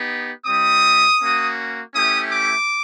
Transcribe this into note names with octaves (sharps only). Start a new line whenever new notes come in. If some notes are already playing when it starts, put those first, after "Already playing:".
Already playing: B3 D#4 G4
G3 C4 E4 D#6
A#3 C#4 F#4
A3 C#4 E4 G4 D#6
D6